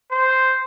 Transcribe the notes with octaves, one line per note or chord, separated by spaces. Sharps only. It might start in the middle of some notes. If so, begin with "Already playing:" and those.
C5